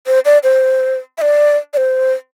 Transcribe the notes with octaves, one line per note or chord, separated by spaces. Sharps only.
C5
D5
C5
E5
D5
D5
C5